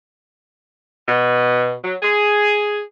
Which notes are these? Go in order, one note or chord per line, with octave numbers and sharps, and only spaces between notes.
B2
F#3
G#4